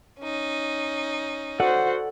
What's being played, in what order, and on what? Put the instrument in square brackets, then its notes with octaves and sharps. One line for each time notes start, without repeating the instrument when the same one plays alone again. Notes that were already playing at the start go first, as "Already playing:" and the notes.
[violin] C#4 D#4
[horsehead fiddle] F#4 C5 [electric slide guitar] A4 D5 F#5